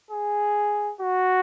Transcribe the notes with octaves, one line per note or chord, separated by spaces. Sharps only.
G#4
F#4